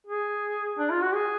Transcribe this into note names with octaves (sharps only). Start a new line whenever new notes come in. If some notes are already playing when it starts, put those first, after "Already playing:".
G#4
D4
F4
F#4
G#4